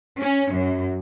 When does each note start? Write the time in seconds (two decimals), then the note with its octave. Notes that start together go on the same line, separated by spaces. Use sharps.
0.21 C#4
0.53 F#2